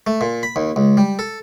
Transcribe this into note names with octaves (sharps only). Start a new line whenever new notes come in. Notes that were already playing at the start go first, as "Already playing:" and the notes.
A3
A#2
B5
D#2
C#2
G3
A4